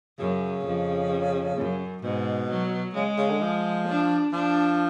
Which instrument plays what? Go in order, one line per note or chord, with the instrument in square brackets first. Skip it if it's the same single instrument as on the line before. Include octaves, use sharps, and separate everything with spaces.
[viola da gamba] F#2 [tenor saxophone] C#3
[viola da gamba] F2
F#2
[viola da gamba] G#2 [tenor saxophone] B2
[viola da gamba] F#3
[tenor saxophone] C#3 [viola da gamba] G#3
[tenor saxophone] C#3
D3
F3
[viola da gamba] D4
[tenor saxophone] F3 [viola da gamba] D4